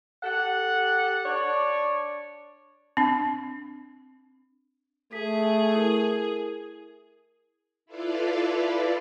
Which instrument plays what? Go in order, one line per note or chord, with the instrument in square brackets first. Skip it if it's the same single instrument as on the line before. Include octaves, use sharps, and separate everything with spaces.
[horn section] G4 A4 F#5
D4 C#5 D5
[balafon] C4 D4
[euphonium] A3 [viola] G#4 [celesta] B6
[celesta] E4 A#4
[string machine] E4 F4 A4 B4 D5 F5